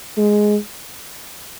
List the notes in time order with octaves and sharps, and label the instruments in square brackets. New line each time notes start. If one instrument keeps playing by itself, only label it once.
[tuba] G#3